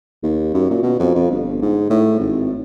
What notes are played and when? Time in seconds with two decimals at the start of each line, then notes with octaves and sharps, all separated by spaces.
0.23 D#2
0.54 F#2
0.70 A#2
0.83 B2
1.00 F2
1.15 F2
1.31 G1
1.62 G#2
1.90 A2
2.19 G#1